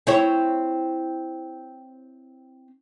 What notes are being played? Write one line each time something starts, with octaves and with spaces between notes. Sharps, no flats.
C4 E4 C#5